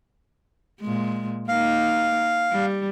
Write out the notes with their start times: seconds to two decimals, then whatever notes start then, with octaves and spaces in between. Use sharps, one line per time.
0.81 A#2 G#3
1.49 A#3 D#4 F5
2.51 G3